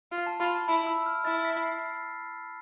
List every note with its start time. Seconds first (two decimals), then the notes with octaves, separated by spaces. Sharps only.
0.12 F4
0.26 A5
0.40 F4 B5
0.55 A5
0.68 E4 B5
0.87 E6
1.06 F6
1.25 E4 A6
1.45 B6
1.63 C7